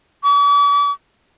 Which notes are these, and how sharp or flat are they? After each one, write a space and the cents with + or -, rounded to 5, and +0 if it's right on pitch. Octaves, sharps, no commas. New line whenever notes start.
D6 -45